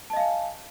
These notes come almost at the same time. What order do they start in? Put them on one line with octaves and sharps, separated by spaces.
A5 D#5 F5 G#5